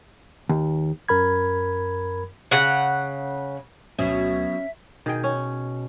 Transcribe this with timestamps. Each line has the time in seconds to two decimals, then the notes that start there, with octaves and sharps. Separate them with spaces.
0.49 D#2
1.09 F#2 A#4 B5 G#6
2.51 C#3 F#5
3.99 D2 B2 F#3 C#4 E5
5.06 B2 D#3 G#4 G5
5.24 C#4